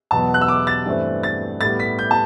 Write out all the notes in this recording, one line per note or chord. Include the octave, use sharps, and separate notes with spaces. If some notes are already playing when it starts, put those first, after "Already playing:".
E2 B2 F#3 B3 A5
F#6
E6
D6
A6
G2 E3 A3 C4
A6
A2 G3 B3 A6
B6
G6
A5